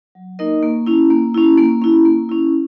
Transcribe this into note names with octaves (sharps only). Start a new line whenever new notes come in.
F#3
A#3 D#4 A#4 D#5
A#3
C#4 E4
A#3
C#4 E4
A#3
C#4 E4
A#3
C#4 E4